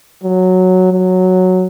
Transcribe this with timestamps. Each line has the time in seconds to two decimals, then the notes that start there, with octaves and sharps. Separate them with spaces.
0.24 F#3
0.92 F#3